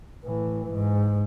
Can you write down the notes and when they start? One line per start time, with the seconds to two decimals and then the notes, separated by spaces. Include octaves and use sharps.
0.25 A2 E3
0.72 G#2